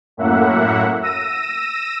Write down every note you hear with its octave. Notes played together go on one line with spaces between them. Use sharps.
F#2 A2 A#3 E5 F#5
E6 A#6 D#7